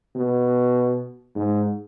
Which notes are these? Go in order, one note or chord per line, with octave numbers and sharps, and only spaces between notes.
B2
G#2